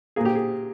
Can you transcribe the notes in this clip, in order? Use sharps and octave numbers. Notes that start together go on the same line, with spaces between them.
A#2 A#3 G#4
G4
G#4